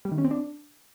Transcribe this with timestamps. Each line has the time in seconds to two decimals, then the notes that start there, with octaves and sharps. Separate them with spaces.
0.05 G3
0.12 D#3
0.18 C#4
0.24 C4
0.31 D4